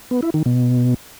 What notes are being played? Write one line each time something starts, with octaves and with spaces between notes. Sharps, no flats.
B3
E4
D#3
B2